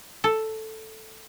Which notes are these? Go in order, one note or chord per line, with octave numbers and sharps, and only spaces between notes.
A4